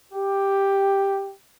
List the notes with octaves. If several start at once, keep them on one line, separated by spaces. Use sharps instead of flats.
G4